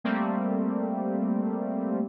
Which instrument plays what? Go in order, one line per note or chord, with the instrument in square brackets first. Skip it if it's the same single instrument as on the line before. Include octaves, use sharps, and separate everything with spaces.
[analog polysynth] G3 A3 A#3 C4